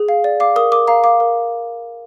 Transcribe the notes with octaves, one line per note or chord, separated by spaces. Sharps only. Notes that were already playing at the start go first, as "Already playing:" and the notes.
Already playing: G#4
F5
D5
F5 D6
A#4 D#6
A#4 D6
F5 A#5
F5 D6
A#4